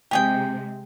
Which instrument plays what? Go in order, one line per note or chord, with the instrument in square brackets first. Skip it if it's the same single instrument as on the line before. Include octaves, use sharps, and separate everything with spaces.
[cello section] C3 G#3 [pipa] G4 G#4 G5